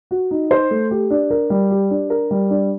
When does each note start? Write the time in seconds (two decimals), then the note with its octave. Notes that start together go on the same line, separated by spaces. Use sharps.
0.11 F#4
0.31 D#4
0.51 C5
0.71 A3
0.91 G4
1.10 D4
1.30 A#4
1.50 G3
1.71 G4
1.91 D4
2.10 A#4
2.31 G3
2.50 D4